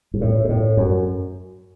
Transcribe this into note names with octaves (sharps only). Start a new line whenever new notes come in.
G#2
A2
G#2
A2
F#2